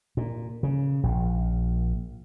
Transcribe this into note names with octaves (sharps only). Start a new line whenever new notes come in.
A#2
C#3
A#1